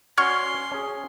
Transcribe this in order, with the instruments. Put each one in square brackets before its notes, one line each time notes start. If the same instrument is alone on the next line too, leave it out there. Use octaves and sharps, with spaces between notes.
[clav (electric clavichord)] C#4 F#4 D5 [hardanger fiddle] C6 [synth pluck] C#6 F6 G#6
[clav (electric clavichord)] C#4 G#4